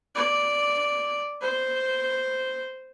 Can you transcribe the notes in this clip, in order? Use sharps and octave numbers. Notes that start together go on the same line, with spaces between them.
D5
C5